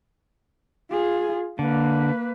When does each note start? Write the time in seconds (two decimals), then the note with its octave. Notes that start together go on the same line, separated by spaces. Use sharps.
0.91 F4 G#4
1.59 D3 A#3 B4